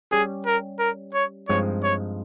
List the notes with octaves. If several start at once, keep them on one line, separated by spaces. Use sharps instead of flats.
G3 C#4 G4 G#4
A#4
A#4
C#5
G2 F3 G#3 C4 D#4 C#5
C#5